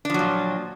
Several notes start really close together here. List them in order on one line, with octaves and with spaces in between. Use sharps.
D4 F3 F#3 A#2